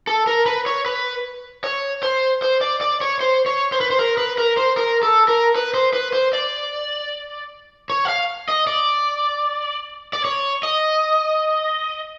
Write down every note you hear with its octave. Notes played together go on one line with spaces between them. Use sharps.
A4
A#4
B4
C#5
B4
C#5
C5
C5
D5
D5
C#5
C5
C#5
C5
B4
C5
A#4
B4
A#4
C5
A#4
A4
A#4
B4
C5
B4
C5
D5
C#5
F#5
F5
D#5
D5
D5
C#5
D#5